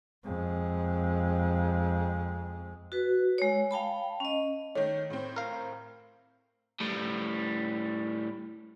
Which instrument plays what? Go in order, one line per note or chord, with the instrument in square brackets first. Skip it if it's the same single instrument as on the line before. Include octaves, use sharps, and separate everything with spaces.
[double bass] F2 G#3
[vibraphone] F#4 B4
G#3 C#5
F5 G5 A5 B5
C#4 D#5
[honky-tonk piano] D#3 A3 [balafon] C#5
[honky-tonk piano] A2 C4
[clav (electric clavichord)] A#4 F5
[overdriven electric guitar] A2 G3